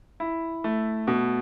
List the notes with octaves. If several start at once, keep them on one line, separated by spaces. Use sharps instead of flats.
E4
A3
B2